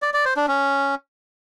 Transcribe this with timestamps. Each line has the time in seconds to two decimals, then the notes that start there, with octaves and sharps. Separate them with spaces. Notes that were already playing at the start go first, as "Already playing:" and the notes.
0.02 D5
0.14 D5
0.25 C5
0.37 D4
0.48 C#4